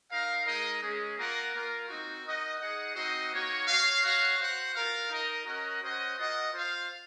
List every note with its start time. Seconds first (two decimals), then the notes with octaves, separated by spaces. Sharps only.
0.11 D#4 A#4 F5
0.46 G#3 D#4 A#4 D#5
0.82 G#3 C#4 G#4
1.17 A#3 F4 A#4 D#5 F#5
1.53 A#3 F4 A#4
1.88 C4 D#4 F#4
2.24 D#4 A#4 D#5 F#5
2.60 D#4 G#4 D#5 F#5
2.95 C4 D#4 F#4 C5 D#5
3.31 A#3 D#4 F#4 C#5
3.67 F#4 C#5 F5
4.02 F#4 C#5 F5
4.37 F#4 C5 F#5
4.74 F4 A#4 F5
5.09 D#4 A#4 D#5
5.44 C#4 F#4 A#4 D#5 F#5
5.81 C#4 F#4 C5 D#5 F#5
6.16 F4 A#4 D#5 F#5
6.51 F4 C5 F5